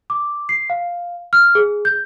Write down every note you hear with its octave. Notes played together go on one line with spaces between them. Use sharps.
D6
C7
F5
F6
G#4
G6